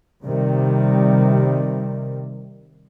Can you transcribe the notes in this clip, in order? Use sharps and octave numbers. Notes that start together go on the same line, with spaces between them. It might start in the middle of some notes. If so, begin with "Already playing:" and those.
C3 D#3 G3